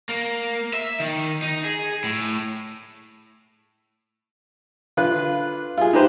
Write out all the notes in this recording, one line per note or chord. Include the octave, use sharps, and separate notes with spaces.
A#3
E5
D#3
D#4
G#4
A2
D3 F4 B4 F#6
F4 G#4
D#4 G4 B4 C5